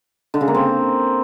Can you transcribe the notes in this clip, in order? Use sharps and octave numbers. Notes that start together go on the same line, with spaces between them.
D3
C#3
A#3
C4